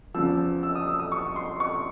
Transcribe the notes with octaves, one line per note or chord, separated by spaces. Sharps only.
E2 C#3 F3 E6
E6
D#6
E6
D#6
C#6
C6
C#6